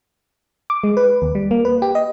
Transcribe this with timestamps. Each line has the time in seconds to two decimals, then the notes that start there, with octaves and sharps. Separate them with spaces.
0.70 D6
0.84 G#3
0.97 B4
1.22 D#2
1.35 G3
1.51 A#3
1.65 B4
1.82 G4
1.95 D#5